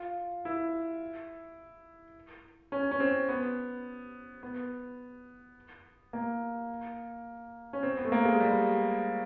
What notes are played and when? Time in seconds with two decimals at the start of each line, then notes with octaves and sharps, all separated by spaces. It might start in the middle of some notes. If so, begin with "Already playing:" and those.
Already playing: F4
0.45 E4
2.72 C#4
2.91 C#4
3.00 C4
3.29 B3
4.43 B3
6.13 A#3
7.73 C#4
7.83 C4
7.97 B3
8.05 A3
8.12 A#3
8.25 G#3
8.40 G3